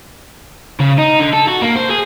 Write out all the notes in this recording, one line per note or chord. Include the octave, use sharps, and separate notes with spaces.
C#3
D#4
D3
A4
F#4
A#3
C5
G#4